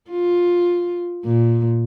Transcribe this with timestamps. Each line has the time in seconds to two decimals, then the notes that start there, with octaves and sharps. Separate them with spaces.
0.10 F4
1.25 A#2